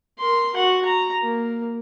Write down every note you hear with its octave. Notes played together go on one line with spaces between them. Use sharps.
A#4 C6
F#4 F#5
A#5
A#3